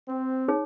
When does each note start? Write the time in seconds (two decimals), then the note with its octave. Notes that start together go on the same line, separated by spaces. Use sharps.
0.08 C4
0.48 D#4 G#4 C#5